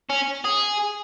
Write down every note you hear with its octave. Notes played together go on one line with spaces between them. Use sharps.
C#4
G#4